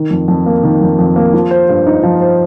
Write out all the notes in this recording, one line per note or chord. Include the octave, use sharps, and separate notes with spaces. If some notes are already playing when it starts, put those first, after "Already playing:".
Already playing: D#3
F2
F2
A#3
D#3
F2
F2
A#3
F3
C5
G2
D#4
F3
C5